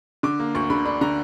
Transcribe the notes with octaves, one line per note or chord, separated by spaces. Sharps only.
D3 D6
A#3
D2 C#6
D3 B5
D4 B5
D3 A#5